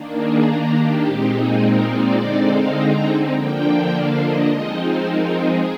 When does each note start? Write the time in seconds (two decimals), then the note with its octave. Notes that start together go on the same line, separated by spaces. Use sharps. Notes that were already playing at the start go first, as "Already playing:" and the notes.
Already playing: D#3 A#3 D4
0.17 G#4
0.45 A#4
0.74 G4
1.03 A#2 G#3 C4 D#4
1.31 G#4
1.60 A#4
1.89 D5
2.18 D3 G#3 C4 D#4
2.46 F5
2.75 A#5
3.32 D3 F3 A#3 D4 G5
3.89 F5
4.18 D#5
4.47 F3 G#3 C4 D#4 D#5
4.76 C5
5.04 A#4
5.32 G#4